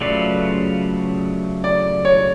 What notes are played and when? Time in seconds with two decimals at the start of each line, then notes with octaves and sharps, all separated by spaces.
0.01 C#3 F#3 A3 F4 B4 D5
1.64 D5
2.05 C#5